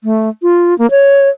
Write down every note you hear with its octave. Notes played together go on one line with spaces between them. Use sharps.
A3
F4
A#3
C#5